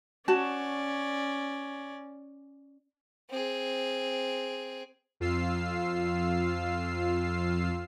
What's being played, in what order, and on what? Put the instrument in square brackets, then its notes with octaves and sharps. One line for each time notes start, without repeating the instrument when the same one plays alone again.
[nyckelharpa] C#4 D5 [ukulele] F#4 A5
[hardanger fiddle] C4 G#4
[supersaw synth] F2 F4 F5 E6 C7